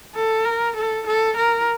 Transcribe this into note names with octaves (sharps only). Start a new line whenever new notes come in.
A4
A#4
A4
A4
A#4